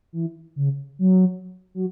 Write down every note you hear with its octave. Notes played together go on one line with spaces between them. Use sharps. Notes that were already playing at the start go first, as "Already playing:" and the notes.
E3
C#3
F#3
F#3